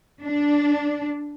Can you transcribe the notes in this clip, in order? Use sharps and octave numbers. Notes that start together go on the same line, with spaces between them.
D4